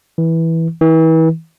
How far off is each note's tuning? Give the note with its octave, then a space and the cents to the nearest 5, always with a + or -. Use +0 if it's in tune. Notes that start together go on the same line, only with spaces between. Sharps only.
E3 -10
E3 -35